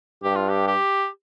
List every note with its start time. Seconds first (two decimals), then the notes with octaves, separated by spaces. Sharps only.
0.23 G2 G4
0.36 F4
0.49 G4
0.67 G4